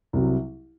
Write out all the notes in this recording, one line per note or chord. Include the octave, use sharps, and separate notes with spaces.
C2 C3 F#3